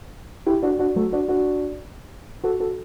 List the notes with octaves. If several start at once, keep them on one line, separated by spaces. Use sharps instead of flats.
E4 G4
D4 F#4
D4 F#4
F#3 A3
D4 F#4
D4 F#4
F#4 A4
F#4 A4